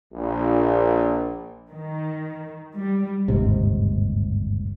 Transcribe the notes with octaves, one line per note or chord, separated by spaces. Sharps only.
A#1
D#3
G3
G1 D#2 G#2 C3